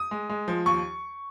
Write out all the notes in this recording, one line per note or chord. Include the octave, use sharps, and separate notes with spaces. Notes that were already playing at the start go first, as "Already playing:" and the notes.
Already playing: D#6
G#3
G#3
F3
D#2 C#6